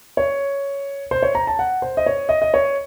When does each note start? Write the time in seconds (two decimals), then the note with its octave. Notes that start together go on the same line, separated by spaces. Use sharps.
0.17 C#5
1.11 C5
1.23 C#5
1.35 A#5
1.47 A5
1.59 F#5
1.82 C5
1.97 D#5
2.06 C#5
2.29 D#5
2.42 D#5
2.54 C#5